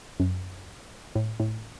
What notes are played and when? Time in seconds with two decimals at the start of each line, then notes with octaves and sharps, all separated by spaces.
0.20 F#2
1.15 A2
1.40 A2